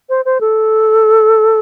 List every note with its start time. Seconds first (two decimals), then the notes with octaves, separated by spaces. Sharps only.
0.09 C5
0.25 C5
0.41 A4